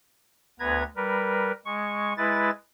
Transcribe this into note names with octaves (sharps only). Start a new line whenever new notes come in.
D2 B3 B4 A#5 G#6
G3 A#4 B4
G#3 C#6
G#3 E4 B4 A6